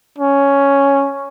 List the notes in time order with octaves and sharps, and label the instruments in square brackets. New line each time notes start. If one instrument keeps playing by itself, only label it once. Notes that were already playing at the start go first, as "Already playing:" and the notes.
[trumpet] C#4